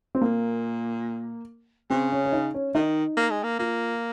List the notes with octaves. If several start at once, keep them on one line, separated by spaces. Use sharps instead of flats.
C4
A#2 A#3
C#3 C4
C#4
C#4
D#4
C#4
D#3 D#4
A#3
G#3
A#3
A#3 F4